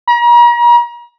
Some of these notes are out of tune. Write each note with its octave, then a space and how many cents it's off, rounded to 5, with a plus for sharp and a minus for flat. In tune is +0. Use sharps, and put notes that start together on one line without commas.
A#5 +40